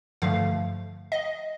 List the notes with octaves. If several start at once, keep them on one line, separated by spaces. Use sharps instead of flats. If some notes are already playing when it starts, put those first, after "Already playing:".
G2 D3 F3 A3 F5
D#5